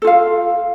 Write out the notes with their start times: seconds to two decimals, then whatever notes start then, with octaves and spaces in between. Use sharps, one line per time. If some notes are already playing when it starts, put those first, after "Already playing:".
0.02 A4
0.05 F4
0.07 F5